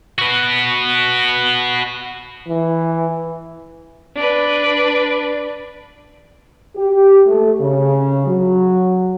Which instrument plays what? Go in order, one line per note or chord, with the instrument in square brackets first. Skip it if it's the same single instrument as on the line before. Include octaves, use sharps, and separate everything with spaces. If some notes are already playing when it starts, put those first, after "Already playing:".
[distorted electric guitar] F#4 B4
[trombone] E3
[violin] D4 B4
[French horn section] G4
A3
C#3
F#3